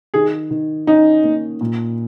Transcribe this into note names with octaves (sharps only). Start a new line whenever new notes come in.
D#3 G#4
D#3
C#4 D#4
A#3
A#2